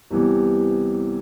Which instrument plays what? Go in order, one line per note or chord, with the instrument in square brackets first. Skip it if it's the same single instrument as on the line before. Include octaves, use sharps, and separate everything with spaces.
[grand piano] C2 C3 E3 B3